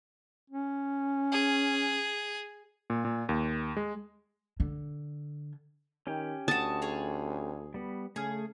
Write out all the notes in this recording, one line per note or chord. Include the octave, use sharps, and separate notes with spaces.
C#4
G#4
A#2
A#2
D#2
G#3
D3
D#3 C#4 G4 G5
D2 F#4 A5 D#6
G#4 C#5
G3 B3
C#3 A3 G#4 F6